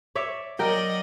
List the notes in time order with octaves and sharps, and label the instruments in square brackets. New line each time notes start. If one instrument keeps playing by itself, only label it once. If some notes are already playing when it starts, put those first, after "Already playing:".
[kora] C#5 D5 E5
[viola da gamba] F#3 D5 D#5 [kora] A#4 G5